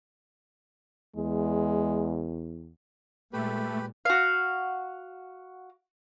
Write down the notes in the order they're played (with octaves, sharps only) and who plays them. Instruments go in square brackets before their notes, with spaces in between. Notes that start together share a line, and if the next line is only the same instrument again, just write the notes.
[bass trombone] E2 [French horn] G#3
[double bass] A#2 G#3 [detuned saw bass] A3 [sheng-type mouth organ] G4 B4
[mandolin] F#4 F5